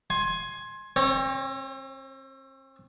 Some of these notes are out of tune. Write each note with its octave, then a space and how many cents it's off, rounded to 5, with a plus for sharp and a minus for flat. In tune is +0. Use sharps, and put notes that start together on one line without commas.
G#5 +10 C6 +20
C4 +40 C#5 -15